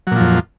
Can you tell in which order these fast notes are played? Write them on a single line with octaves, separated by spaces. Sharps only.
F#3 A#2 F3 F2